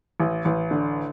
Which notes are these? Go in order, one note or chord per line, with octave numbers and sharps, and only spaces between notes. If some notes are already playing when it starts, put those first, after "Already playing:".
A1
A1
D3